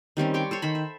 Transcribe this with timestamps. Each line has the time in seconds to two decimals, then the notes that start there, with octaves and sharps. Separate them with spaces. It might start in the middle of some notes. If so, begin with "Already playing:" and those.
0.17 D#3 G3 C4 C#4
0.34 C#5 G5 C6 D6
0.51 A4 C5 C#5
0.62 D#3 C5 B5
0.75 E5